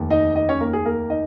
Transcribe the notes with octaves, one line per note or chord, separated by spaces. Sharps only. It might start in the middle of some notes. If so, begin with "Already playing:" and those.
Already playing: F1 D#2 D#3
D#4 D#5
D#4 D#5
C#4 C#5
A#3 A#4
G#4
A#3 A#4
D#4 D#5